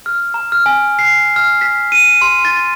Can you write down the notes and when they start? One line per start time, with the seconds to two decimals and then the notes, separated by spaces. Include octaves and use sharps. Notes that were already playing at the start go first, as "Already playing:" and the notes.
0.06 F6
0.34 A#5
0.52 F6
0.66 G#5
0.99 C7
1.36 F6
1.61 B6
1.92 D#7
2.21 C6
2.45 A6